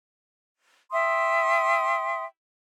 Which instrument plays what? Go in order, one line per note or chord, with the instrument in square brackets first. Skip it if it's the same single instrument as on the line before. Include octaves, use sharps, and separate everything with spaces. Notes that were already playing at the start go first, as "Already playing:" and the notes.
[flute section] E5 G5 C6 D#6